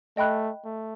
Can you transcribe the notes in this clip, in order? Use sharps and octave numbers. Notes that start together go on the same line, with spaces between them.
A3 D#5 G5 B5 F#6
A3